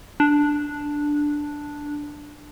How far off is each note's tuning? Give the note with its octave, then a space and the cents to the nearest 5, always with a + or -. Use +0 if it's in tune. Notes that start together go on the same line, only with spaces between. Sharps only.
D4 +0